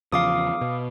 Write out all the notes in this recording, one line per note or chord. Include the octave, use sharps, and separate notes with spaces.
E2 C#3 F3 F5 D6 D#6
B2